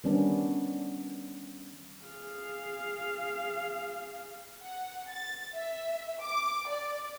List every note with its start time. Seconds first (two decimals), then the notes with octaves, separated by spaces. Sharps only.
0.04 D#3 G3 B3 C#4 D4
2.04 G#4 F5
4.62 F#5
5.10 A6
5.54 E5
6.22 D6
6.68 D5